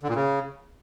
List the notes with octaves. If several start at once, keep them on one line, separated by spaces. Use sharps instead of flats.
D3
A#2
C#3